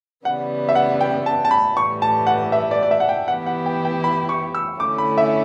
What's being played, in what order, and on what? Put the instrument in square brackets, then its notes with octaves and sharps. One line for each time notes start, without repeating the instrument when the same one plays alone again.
[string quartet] C#3 E3 G3 B3 [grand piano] F#5
[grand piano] E5
F#5
G5
A5
A5
B5
[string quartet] A2 E3 G3 [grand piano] C#6
[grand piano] A5
F#5
E5
D5
D5
E5
F#5
G5
[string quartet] E3 B3 E4 G4 [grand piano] F#5
[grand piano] F#5
G5
G5
B5
C#6
E6
[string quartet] D3 A3 C#4 E4 [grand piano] D6
[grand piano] B5
E5